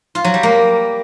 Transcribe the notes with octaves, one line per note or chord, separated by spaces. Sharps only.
F4
F#3
G3
A#3